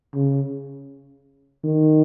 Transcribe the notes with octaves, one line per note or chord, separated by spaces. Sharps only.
C#3
D#3